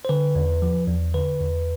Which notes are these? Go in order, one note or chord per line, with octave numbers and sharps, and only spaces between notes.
C5
D3 B4
E2
F3
E2
D3 B4
E2